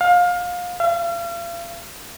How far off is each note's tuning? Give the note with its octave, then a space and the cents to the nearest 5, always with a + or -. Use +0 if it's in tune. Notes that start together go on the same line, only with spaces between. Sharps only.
F5 +25
F5 -40